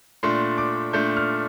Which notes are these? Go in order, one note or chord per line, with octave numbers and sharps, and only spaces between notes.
A#2 A3 D4 C6
D6
A#2 A3 D4 G6
F6